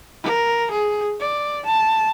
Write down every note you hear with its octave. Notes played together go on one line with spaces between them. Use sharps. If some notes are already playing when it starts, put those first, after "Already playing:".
A#4
G#4
D5
A5